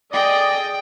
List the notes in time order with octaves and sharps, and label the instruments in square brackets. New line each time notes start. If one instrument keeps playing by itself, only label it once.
[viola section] G#4 A4 D#5 [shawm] D5 [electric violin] G5